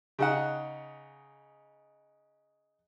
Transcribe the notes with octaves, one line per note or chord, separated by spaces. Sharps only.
C#3 D#4 F#5